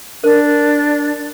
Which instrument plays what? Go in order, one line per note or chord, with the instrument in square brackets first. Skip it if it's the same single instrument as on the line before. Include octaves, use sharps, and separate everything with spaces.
[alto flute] D4 [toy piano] A#4 C5